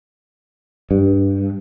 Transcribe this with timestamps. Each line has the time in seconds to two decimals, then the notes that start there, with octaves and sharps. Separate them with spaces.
0.91 G2